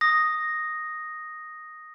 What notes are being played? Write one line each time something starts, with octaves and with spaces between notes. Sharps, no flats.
D#6 A#6